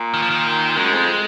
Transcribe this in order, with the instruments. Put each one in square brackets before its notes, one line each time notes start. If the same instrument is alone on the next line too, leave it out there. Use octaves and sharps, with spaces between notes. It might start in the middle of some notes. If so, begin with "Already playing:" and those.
Already playing: [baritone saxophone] A#2
[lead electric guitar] D#3
F3
D#3
[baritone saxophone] F#2 [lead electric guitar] G#3
[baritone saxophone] F2